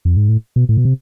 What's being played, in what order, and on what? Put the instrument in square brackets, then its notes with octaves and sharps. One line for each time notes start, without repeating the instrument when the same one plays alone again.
[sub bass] F2
G#2
A2
B2
A2
B2
C3